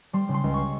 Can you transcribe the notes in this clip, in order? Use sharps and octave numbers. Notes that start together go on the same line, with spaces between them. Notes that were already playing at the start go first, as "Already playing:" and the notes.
G3 C6
C#3
C6
C#2
C#6